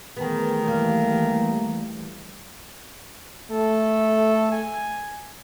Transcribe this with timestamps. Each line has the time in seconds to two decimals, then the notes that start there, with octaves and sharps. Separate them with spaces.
0.16 D#3 E3 G3 A3 B3 G#4
0.63 E2 A#3
3.51 A3 A4
4.52 G#5